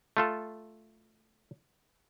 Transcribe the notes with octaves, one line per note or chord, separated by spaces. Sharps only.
A3 F4 A4